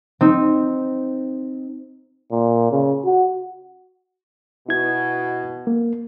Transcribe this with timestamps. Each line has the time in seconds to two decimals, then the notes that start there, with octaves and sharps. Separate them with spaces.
0.21 C4 D#4
2.31 A#2
2.71 C#3
3.05 F#4
4.69 B2 E4 G#6
5.67 A#3